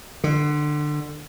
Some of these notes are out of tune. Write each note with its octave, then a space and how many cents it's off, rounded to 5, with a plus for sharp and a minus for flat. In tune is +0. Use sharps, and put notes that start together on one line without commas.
D3 +25